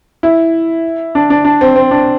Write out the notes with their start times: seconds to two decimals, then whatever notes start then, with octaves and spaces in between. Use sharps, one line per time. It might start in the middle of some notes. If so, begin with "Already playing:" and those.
0.23 E4
1.15 D4
1.30 D4
1.45 D4
1.61 C4
1.76 C4
1.91 D4